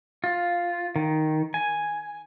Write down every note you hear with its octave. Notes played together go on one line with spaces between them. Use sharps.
F4
D#3
G#5